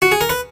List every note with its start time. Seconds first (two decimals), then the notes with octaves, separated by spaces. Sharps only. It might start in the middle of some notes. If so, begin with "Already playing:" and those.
0.02 F#4
0.12 G#4
0.21 A#4
0.29 B4